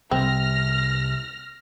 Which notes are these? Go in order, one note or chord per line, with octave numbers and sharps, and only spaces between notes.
C2 C3 G3 C4 F6 A#6